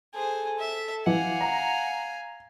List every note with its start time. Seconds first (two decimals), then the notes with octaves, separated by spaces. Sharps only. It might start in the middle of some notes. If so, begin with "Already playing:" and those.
0.15 G#4 A4 C5
0.59 E5
1.06 E3 F5 F#5 G#5
1.41 A#5